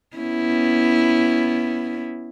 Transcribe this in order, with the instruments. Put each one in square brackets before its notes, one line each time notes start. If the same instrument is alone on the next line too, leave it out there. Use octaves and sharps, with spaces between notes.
[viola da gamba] B3 C#4 E4